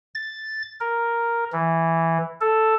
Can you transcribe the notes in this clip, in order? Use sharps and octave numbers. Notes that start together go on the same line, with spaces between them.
A6
A#4
E3
A4